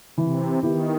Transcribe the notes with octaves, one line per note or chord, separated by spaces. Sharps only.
C3 E3
D#3 B3 E4 G4